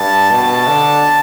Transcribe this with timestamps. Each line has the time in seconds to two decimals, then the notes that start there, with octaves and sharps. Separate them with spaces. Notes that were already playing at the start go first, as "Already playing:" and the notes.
Already playing: G2 A5
0.30 B2 A5
0.68 D3